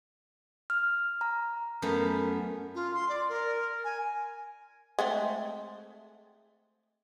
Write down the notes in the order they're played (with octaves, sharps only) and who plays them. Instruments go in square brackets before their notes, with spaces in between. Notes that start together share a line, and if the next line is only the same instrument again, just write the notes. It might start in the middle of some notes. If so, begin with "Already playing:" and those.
[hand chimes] F6
A#5
[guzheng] F#2 A3 B3
[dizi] F4
C6
D5
A#4
G#5
[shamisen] G#3 A3 C4